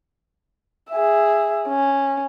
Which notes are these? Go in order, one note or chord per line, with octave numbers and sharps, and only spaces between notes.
G#4 E5
C#4